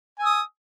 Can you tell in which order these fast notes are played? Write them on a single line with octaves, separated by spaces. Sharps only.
G#5 E6 D#6